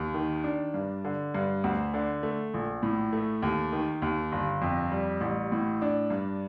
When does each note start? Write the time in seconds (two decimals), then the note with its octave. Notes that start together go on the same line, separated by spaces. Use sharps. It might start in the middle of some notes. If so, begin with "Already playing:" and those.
Already playing: D#2
0.14 D#3
0.44 D4
0.74 G2
1.04 D3
1.35 G2
1.64 D2
1.94 D3
2.23 A3
2.54 A#1
2.83 A2
3.12 A3
3.42 D#2
3.72 D#3
4.02 D#2
4.32 G1
4.62 F2
4.92 G3
5.21 A1
5.52 A2
5.82 D4
6.10 G2